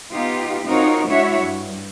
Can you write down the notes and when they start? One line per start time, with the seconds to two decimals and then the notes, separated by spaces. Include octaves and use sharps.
0.13 B3 D#4 F4 G4
0.66 C4 D#4 F4 F#4 A#4 C#5
1.07 G#3 D4 E4 F#4 C#5 E5
1.40 G2